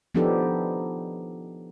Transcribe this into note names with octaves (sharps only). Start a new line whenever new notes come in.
F3 B3 D4 D#4 G4 A4